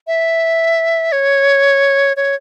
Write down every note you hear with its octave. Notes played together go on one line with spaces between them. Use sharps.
E5
C#5
C#5